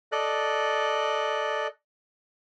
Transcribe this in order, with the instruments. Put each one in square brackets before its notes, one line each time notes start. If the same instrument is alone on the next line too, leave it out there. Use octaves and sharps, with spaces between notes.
[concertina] A4 D5 D#5 F#6